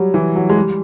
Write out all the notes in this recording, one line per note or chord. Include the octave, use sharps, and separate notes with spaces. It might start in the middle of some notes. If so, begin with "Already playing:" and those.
Already playing: F#3 G3
E3
F#3
G#3
G3